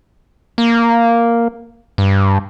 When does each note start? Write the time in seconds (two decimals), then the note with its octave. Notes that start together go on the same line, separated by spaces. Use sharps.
0.58 A#3
1.98 G2